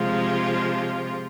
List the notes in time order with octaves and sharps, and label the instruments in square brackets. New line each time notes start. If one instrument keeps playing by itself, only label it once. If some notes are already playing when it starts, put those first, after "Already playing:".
Already playing: [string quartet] C3 F3 G#3 F4